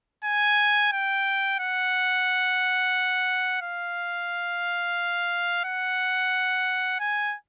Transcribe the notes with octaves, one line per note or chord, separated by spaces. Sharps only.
G#5
G5
F#5
F5
F#5
G#5